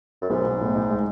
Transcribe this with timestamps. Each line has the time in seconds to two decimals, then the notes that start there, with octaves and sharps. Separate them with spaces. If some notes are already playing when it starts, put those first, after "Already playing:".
0.22 F#2
0.30 B1 G#2
0.44 B1
0.60 A2
0.75 D#4
0.90 G#3